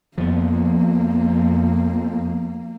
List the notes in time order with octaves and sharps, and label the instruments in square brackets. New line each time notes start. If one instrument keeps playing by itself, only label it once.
[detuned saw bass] F2 [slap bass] F3 B3 [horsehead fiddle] A#3